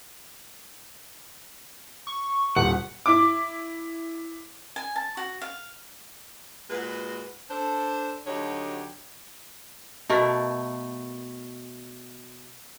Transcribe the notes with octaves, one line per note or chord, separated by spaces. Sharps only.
C#6
D#1 F#5
E4 D6
G#5
A5
F#4
F5
A#2 G#3 F#4 B4
D4 A4 C5
D2 D3 F#3 D#4 G4 C#5
B2 A3 A#4